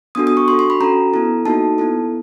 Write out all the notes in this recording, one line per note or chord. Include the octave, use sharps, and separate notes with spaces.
B3 D4 F#4 A4 D#6
D#6
C#6
D4 F#4 A4 C6
C6
B5
C#4 F#4 A4 A#5
B3 E4 A4
A#3 D#4 F#4 A4 A5
B3 E4 A4